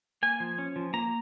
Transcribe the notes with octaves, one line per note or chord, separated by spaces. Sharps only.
A#3 G#5
F3
C#4
F3
A#3 A#5